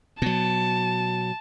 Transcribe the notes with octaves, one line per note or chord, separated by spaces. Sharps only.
B2 F#3 A5